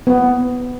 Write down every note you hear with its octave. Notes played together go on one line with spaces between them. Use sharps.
B3